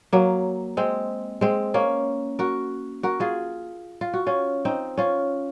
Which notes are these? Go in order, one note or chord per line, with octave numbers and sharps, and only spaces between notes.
F#3 A#3
G#3 C4
G#3 C4
A#3 C#4
F#4 A#4
F#4 A#4
F4 G#4
F4
F#4
C#4 F4
C4 D#4
C#4 F4